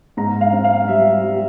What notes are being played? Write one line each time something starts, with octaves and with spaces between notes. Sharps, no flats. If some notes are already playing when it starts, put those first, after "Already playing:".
G#2 A#5
F5
C4
F5
G3 E5
G3